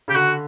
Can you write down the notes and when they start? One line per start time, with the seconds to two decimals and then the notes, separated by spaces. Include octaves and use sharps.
0.08 C#3 G4
0.15 D3 F#4